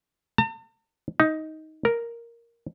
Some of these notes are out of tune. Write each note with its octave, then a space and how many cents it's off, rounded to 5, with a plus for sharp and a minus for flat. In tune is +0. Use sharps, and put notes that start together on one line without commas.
A5 +45
D#4 +10
A#4 +0